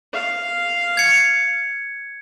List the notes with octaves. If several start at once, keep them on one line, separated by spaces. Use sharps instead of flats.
F5
G#6 C#7